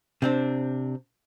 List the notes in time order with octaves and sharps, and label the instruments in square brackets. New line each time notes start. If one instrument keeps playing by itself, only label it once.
[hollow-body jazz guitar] C3 C4 D4